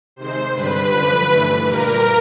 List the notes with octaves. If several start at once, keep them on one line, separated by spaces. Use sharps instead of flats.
C3 D#3 G#3 C5
G2 D3 G3 B4
F#2 D3 F3
G2 E3 A3
A#2 G3 A#3 A#4